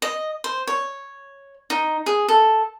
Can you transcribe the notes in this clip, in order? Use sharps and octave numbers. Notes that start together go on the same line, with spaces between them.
D#5
C5
C#5
D#4
G#4
A4